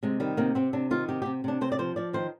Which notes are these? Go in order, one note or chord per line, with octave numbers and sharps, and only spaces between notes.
C3 G#3
D#3 G3
C3 A#3
C3 C4
C3 D4
D#3 F4
C3 G4
C3 G4
C3 D4
C3 C5
D5
F3 C5
F3 D5
D#3 C5